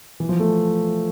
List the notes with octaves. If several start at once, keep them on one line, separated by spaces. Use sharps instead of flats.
E3
F3
A3